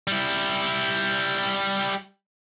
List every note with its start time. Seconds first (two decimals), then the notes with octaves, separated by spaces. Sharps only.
0.08 G3 E4